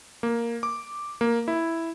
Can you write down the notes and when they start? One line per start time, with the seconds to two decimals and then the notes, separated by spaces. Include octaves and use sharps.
0.23 A#3
0.63 D6
1.21 A#3
1.48 E4